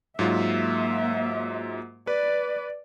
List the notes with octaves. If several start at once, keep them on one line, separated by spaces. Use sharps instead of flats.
G#2 F#3 A#3 F4 E5
B4 D5